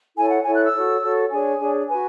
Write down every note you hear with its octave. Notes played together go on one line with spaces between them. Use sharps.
E4 A4 C#5 G#5
F#5
E4 A4 C#5 G#5
F#6
E6
F#4 A4 C#5
F#4 A4 C#5
D4 G#4 C#5 G#5
D4 G#4 C#5
F#4 B4 G#5